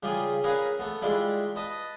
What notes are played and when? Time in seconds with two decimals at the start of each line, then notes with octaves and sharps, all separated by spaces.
0.03 C#3 G3 F4 G#4
0.44 C#4 G#4 A#4 B4 F5 B5
0.79 A3 B3
1.02 G3 G#3 D4 E4 F4
1.56 B4 D#5 A5